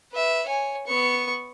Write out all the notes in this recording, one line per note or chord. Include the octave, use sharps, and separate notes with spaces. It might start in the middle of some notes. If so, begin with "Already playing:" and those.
B4 E5
C#5 G#5
B3 C#6